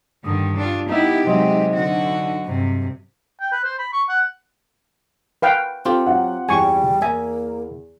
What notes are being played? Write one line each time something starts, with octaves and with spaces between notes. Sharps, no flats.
G2 D3 D#3 D#6
D4 F4
B3 D#4 E4 G4 E5
C3 F#3 G#3 C5 D#5
D3 F#4
G2 C3
G5
B4
C5
B5
C#6
F#5
B4 F5 G5
C4 F4 G4 A4
F#3 F#5
E2 G3 G#5 C#6
A#3 E5 G#5